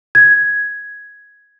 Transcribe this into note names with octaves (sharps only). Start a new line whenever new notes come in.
G#6